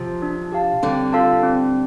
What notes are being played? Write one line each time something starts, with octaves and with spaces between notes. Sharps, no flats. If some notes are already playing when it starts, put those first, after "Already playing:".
Already playing: C3 F3
D4
G4 F5 A5
D3 G3 C4
F4 A4 F5 A5
C4